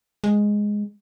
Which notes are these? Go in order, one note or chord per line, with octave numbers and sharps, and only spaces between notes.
G#3